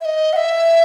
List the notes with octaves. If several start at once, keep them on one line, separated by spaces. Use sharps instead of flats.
E5
D#5
F#5
E5